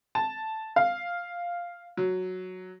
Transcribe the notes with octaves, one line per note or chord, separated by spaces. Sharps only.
A5
F5
F#3